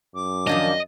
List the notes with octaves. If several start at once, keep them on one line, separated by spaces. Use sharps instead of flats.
F#2 D6
D#3 F3 D4 D#5